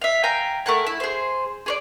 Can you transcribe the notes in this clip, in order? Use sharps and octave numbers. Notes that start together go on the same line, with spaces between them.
E5 F5
F5 G5 G#5 A#5
A3 A#4 F#5 G#5
E4
G#4 C5
G#4 C#5 D5